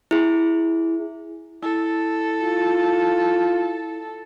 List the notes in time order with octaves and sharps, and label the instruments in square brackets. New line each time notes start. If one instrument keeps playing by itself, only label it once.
[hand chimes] E4 G#4
[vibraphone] E4 [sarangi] A4
[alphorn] F4